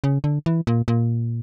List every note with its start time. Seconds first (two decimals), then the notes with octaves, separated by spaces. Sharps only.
0.04 C#3
0.24 D3
0.46 E3
0.67 A#2
0.88 A#2